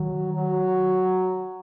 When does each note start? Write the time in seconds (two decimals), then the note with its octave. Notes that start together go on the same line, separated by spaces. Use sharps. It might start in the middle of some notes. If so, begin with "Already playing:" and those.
Already playing: D#3 F#3
0.33 F#3